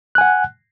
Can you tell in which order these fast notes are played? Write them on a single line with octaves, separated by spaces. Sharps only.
F#6 G#5 F#5